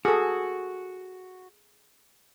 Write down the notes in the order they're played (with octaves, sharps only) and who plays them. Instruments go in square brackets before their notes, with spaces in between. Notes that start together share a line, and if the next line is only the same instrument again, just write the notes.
[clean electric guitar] F#4 [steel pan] G#4 A4